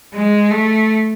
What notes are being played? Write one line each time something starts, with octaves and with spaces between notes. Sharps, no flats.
G#3
A3